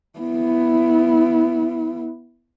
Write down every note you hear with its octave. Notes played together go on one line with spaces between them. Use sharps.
B3 E4